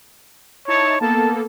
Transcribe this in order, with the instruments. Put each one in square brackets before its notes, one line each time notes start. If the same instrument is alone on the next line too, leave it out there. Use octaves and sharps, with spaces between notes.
[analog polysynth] D#4 E4 A5 [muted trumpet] C#5
[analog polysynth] A#3 B3 A4 [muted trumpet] A5